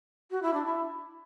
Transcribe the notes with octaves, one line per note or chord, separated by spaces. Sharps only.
F#4
E4
D4
E4